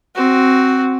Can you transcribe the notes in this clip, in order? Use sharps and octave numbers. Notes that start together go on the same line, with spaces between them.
C4 F#4